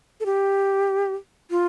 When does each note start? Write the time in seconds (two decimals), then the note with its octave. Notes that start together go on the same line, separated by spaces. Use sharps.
0.20 A4
0.26 G4
1.51 F4